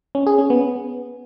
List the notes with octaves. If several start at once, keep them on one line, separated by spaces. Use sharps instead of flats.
C#4
G#4
C#4
B3